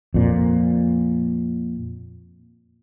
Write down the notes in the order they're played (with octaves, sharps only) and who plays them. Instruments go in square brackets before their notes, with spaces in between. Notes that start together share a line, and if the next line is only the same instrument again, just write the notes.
[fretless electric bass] F2 A#2